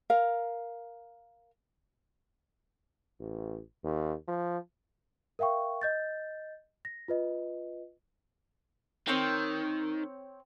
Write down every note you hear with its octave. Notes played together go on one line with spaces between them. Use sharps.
A#4 F5
A1
D#2
F3
A#4 E5 F5 G5 C#6
D#5 G6 A6
A#6
F4 B4 D#5
D#3 C4 C#5 G5